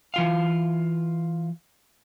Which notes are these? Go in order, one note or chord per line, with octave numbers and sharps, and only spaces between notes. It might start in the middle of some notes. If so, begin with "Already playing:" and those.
E3 F4 F5